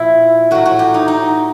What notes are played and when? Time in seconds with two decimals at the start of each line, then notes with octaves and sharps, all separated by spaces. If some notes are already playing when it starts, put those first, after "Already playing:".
Already playing: A#2 F3 E4
0.51 A2 F#3 F#4
0.66 F#4
0.79 G4
0.94 D#4
1.08 D#4